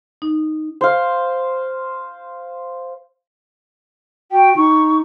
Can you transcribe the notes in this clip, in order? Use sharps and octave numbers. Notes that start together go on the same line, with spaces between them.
D#4
C5 F5
F#4 G5
D#4 C#6